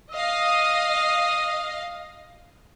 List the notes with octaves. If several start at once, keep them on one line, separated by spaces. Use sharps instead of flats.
D#5 F5 D#6